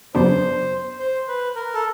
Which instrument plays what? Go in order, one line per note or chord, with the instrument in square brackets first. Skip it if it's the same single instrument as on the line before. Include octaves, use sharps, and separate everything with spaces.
[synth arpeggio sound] F#2 C#3 F#3 B3 D4 [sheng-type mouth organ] C5
[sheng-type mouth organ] C5
B4
A#4
A4